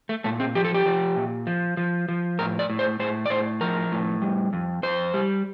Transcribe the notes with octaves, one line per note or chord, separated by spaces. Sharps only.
A3
A#2 A3
C4
F3 G4
A4
G4
F3
A#2
F3
F3
F3
A2 A#4
D5
A2
C5
A2 C5
D5
A2 C5
F3 A#4
A2
G3
F2
F2 C5
G3